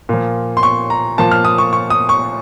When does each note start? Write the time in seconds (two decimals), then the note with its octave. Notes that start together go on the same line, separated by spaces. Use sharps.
0.09 A#2 F3
0.57 C6
0.63 C#6
0.90 A#5
1.18 A#2 F3 A5
1.31 F6
1.45 D#6
1.58 C#6
1.73 C#6
1.90 D#6
2.09 C#6